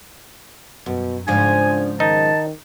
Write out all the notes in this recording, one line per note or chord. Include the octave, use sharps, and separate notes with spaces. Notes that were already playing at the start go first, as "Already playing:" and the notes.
F#2 B2
G#2 C#3 F3 D4 G#5
D#3 D#4 A5